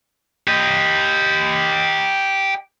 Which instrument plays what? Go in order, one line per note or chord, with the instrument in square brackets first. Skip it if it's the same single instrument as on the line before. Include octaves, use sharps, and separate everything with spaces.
[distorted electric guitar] G4 D#5